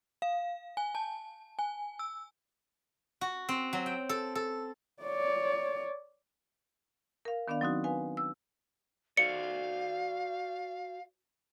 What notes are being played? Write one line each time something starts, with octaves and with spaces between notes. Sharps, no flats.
F5
G#5
A5
G#5
E6
F#4
C4
F#3
G5
A4
A4
C#5 D5
A#4 F5
D#3 B3 D4 D5 F5
F#3 C4 D#4 F#4
B4 F5 G#5
E6
F#4 C5 D5 F5 C#7